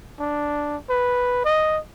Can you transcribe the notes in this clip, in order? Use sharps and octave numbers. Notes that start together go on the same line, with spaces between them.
D4
B4
D#5